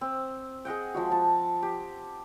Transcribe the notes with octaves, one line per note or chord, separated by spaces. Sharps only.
C4
G#4 D#5 F#5 G5
F3 G#3 F#4
F3 A5
G4